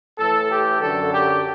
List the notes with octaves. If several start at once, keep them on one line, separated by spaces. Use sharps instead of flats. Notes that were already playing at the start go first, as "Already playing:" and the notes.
A2 E3 A4
G4
F#2 D3 F#3 A4
G4